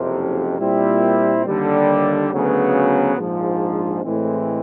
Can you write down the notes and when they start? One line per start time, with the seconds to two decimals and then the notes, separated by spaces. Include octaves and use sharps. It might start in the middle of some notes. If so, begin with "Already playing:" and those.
Already playing: F#1 F2 C3
0.59 A#2 G3 C4 E4
1.45 D#2 D3 G3
2.31 D2 C#3 F#3 B3
3.16 A#1 G#2 F3
4.02 A2 E3 G#3 C4